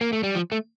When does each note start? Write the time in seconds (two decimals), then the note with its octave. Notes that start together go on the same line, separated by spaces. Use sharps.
0.01 A#3
0.13 A3
0.23 G3
0.35 F3
0.52 A3